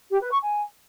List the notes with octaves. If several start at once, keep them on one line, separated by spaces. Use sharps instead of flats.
G4
B4
C#6
G#5